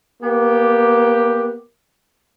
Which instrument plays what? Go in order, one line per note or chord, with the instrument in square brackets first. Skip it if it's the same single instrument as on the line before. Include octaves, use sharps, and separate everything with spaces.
[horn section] A#3 B3 G4